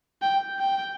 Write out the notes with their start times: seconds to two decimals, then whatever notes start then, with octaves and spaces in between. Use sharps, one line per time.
0.22 G5
0.59 G5